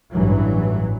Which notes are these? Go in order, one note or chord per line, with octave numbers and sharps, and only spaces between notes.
A1 G2 E3 F#3